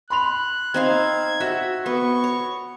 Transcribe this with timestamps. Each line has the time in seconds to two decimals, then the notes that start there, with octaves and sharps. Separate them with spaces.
0.10 B5 C6 F#6 F7
0.74 C4 D#4 F5 G#6
1.40 F#4 E5
1.86 B3 C#6
2.24 C#5